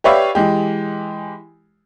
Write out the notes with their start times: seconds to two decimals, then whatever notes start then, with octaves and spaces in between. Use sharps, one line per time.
0.04 G4 B4 C#5 D5 E5 F5
0.35 E3 G#3 G4